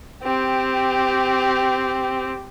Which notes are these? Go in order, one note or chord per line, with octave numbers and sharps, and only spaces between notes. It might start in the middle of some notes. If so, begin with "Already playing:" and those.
C4 G4